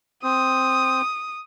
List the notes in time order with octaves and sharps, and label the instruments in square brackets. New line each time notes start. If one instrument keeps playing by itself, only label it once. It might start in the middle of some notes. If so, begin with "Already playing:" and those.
[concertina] C4 [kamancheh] D#6